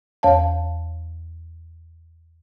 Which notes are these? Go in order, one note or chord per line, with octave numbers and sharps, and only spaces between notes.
E2 C#5 F5 A5